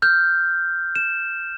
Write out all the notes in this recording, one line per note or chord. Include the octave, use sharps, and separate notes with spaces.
F6 G6
E7